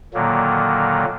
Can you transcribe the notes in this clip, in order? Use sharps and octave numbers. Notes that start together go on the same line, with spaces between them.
A#2 D3 D#3 F#3 A#3